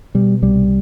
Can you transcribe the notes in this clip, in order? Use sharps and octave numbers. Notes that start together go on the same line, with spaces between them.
B2 G3
C2 G3